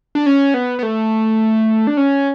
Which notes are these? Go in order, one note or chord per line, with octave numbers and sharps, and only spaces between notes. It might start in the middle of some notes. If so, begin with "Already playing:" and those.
D4
C#4
B3
B3
A3
D4
C#4